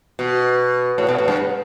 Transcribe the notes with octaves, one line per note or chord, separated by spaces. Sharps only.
B2
A2
B2
A2
G2